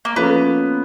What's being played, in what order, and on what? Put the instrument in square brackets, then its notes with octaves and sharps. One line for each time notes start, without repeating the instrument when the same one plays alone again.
[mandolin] A#3
[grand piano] F3 A#3 C#4 F4 A4 [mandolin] B3